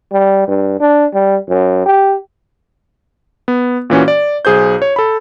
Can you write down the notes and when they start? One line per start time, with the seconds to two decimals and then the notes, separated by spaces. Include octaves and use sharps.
0.12 G3
0.48 G2
0.80 D4
1.14 G3
1.49 F#2
1.86 G4
3.48 B3
3.90 A#2 E3 C#4 F#4
4.08 D5
4.45 B1 G#4 C5 G6
4.82 C#5
4.96 A4 B5